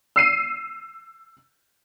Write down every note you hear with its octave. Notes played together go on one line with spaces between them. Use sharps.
E6 C7 D#7